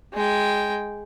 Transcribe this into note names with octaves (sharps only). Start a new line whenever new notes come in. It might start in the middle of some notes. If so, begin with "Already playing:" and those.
G#3 G5